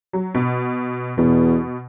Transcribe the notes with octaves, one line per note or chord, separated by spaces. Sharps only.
F#3
B2
E2 B2